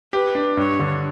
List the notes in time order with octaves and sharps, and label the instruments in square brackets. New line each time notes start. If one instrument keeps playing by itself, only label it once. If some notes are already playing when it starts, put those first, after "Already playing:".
[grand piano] G4 [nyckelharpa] B4
[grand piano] D4
[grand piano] G2 [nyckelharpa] C#5
[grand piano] D3